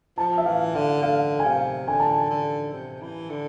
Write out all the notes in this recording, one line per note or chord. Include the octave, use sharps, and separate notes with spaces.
F3 A5
E5
E3 F5
D3 F5
D3 F5
G#5
C3 F5
D3 G#5
A5
G#5
D3
C3
E3
D3